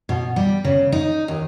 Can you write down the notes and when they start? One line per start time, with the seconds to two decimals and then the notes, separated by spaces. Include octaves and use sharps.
0.09 B2
0.36 G3
0.64 C#3
0.92 D#4
1.28 D#2